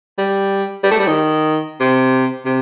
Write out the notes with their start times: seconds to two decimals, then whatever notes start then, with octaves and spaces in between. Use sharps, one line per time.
0.18 G3
0.83 G3
0.91 A3
0.99 G3
1.07 D#3
1.80 C3
2.45 C3